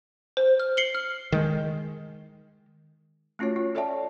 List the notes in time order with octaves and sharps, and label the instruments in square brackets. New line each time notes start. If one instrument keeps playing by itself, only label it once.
[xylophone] C5
F6
C7 C#7 F#7 G7
F6
[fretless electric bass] D#3 G#3
[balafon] A3 C#4 F4 F#4 C#5
F4
A4 C#5 D5 E5 G5 A5